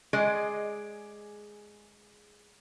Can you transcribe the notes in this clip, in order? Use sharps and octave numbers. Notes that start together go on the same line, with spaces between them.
G#3 G#4 D5 D#5